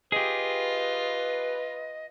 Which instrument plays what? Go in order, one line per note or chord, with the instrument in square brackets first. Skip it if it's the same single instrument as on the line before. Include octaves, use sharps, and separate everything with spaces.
[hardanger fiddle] F4 [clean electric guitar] G4 G#4 [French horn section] B4 [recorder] D#5